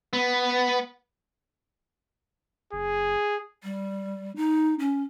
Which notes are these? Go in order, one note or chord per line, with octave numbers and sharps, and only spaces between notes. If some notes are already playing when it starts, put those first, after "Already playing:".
B3
F#1 G#4
G3
D#4
C#4